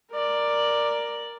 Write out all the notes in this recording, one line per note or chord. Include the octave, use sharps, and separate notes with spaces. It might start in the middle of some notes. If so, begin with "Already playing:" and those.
A#4 D5